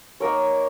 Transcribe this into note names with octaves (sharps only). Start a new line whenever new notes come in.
A#3 D#4 A#4 C#5